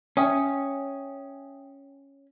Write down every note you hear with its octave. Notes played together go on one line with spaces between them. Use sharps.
C#4 E5 G5 D#6